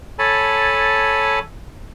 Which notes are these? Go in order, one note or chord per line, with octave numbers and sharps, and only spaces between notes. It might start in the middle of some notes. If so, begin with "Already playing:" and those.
A4 C#5 G#5 A5 B5